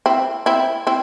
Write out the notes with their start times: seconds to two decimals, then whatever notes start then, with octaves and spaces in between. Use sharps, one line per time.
0.06 C4 E4
0.46 C4 E4
0.87 C4 E4